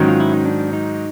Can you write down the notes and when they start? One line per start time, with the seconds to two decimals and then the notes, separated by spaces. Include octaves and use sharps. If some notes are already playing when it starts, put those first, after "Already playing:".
Already playing: G#2 D#3 F#3 C#4
0.08 F4
0.20 E4
0.33 D#4
0.45 D4
0.73 D#4